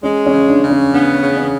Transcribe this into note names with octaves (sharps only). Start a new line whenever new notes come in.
G#3 C#4
C#4
C#3
D4
C#3
C#4
B3 D4
C#3
C#4